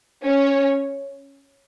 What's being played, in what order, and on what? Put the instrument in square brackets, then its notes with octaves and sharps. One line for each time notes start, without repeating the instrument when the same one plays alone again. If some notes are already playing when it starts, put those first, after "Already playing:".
[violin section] C#4 C#5